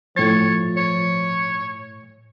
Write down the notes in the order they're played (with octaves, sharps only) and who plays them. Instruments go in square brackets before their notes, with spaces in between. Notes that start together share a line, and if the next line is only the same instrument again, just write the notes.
[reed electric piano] A2 A6 [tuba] F3 [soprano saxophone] C#5
[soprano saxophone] C#5